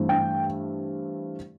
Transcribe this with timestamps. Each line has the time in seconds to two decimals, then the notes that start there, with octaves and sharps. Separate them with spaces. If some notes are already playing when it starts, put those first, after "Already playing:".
Already playing: G2 E3 A3 C4
0.09 G5